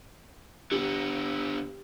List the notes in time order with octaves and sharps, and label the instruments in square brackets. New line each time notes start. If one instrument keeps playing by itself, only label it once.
[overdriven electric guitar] D3 B3 [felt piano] G4